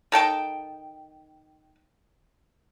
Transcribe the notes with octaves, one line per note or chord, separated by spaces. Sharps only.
D#3 A4 G5 A5